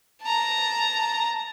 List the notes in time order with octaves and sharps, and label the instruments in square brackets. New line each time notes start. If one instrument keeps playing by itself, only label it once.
[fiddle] A5 A#5